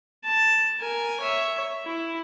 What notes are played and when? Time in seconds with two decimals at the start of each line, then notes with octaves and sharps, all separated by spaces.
0.25 A5
0.79 A#4 G#5
1.20 C#5 E5
1.85 E4